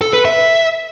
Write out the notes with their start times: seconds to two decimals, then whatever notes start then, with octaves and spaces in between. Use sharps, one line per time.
0.01 A4
0.13 B4
0.25 E5